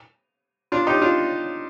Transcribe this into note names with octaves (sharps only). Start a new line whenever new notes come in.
D4 F4
D#4 G4
D4 F4